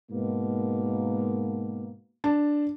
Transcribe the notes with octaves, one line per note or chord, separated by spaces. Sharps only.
G#2 B2 A#3
D4 A5